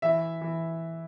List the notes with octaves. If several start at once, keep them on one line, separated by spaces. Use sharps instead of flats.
E3 E5
E3